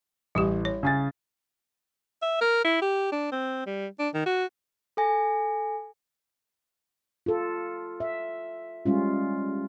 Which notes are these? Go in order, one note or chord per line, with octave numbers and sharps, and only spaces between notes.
A1 G3 E4 G4
C#5
C#3 G#5 A6
E5
A#4
E4
G4
D4
C4
G3
D4
D#3
F#4
A4 G#5 A#6
F4 A4
E5
G3 G#3 C#4 F4